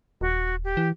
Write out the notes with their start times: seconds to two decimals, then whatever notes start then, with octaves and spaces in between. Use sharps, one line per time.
0.21 D#1 F#4
0.64 G4
0.77 E3